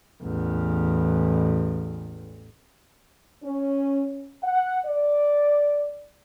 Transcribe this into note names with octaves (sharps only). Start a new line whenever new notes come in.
A1 E2
C#4
F#5
D5